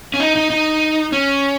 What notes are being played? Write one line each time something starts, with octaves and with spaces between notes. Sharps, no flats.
C#4
D#4
D#4
D#4
C#4